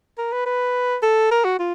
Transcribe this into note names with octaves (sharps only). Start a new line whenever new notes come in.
A#4
B4
B4
A4
A#4
F#4
F4